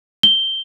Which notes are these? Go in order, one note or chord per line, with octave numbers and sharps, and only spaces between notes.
G7